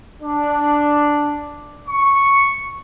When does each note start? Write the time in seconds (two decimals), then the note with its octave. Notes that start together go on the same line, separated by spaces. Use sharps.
0.22 D4
1.89 C#6